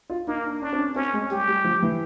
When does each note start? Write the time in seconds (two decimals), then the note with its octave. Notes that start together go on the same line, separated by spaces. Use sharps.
0.10 F4
0.27 A#3 D#4
0.44 D4
0.62 C#4 D4
0.72 C4
0.78 C#4
0.95 C4 C#4
1.13 G#3
1.31 G3 G4
1.48 G3
1.64 F3
1.83 E3